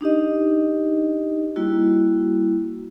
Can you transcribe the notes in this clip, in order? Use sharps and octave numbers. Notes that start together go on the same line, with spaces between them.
D4 D#4 G4 D#5
G3 A#3 E4 F#4